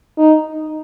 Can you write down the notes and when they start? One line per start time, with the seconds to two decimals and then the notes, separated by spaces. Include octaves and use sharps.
0.18 D#4